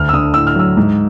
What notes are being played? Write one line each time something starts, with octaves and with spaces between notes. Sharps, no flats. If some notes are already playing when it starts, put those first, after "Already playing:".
Already playing: D2 F6
E6
D3 D#6
A2 E6
F6
F#3 E6
G#2